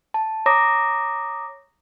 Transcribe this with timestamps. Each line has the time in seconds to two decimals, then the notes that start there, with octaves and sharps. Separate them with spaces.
0.14 A5
0.46 C#5 A#5 D6 D#6 A#6